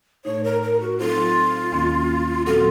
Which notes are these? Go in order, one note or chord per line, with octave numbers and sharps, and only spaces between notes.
A2 A3 D#4 C#5
A#4
A#4
F#4
F#3 C4 D#4 F4 A4 C5
D#2 D#3 A#3 C#4
A#2 F#3 C4 F4 F#4 A4